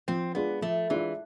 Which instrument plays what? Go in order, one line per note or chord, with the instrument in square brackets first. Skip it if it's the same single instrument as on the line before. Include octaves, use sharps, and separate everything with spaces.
[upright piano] F3 [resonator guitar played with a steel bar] C4
[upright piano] G#3 D4 F4 [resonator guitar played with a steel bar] B3
[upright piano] F3 [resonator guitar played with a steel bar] A3
[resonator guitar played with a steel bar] E3 [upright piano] G#3 D4 F4